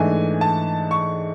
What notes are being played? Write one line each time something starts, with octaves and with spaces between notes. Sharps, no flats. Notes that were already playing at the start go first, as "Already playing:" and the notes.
Already playing: G#2 E3 A3 D4 G#5
A5
C#6